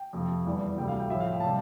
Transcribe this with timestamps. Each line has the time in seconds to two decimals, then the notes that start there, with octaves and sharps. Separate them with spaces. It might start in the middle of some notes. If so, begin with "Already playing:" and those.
Already playing: G5
0.13 F2 C3 F3
0.45 E2 E3 G3
0.77 D2 C3 G3 G5
0.88 F5
1.00 G5
1.10 A2 F3 E5
1.20 F5
1.31 G5
1.40 C3 G3 A5